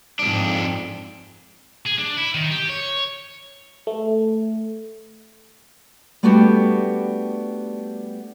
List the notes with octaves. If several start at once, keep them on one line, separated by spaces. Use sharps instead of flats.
F2 G#2 D4
G#4
D4
E4
D#3
G4
C#5
A3
G3 A3 B3 D4 F#4 G4